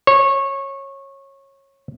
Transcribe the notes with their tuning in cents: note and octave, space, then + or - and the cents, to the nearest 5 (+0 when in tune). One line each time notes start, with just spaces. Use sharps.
C#5 -20